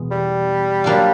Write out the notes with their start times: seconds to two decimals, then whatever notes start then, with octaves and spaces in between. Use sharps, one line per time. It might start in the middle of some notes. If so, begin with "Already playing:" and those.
Already playing: E2 B2 G#3 B3
0.11 G3
0.84 F#3 A#3 D4 F4